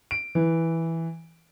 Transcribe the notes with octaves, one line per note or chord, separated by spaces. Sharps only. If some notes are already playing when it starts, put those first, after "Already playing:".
D7
E3